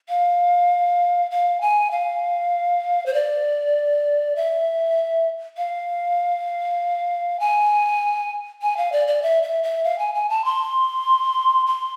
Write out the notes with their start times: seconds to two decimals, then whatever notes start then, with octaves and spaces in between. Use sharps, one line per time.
0.09 F5
1.31 F5
1.61 G#5
1.91 F5
3.06 C5
3.14 D5
4.36 E5
5.57 F5
7.40 G#5
8.62 G#5
8.77 F5
8.92 D5
9.07 D5
9.23 E5
9.43 E5
9.63 E5
9.84 F5
9.99 G#5
10.14 G#5
10.30 A5
10.45 C6
11.67 C6